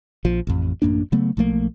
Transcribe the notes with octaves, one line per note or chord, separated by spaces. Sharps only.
A#1 F3
A1 F2
A1 F#2 A#3 D4
C#3 F#3 A3 B3
B1 F3 A3 A#3